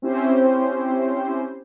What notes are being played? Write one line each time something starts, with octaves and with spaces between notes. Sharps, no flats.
C4 C#4 E4 G4 C5